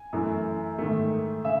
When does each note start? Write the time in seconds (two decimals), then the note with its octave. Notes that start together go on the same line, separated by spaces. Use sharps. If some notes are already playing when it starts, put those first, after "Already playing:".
Already playing: G#5
0.13 F#2 E3 A3
0.78 G#2 D#3 A3
1.44 C#3 E5